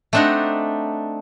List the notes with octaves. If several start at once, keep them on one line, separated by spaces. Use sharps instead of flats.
A3 C4 D4 D#4 F#5 A#5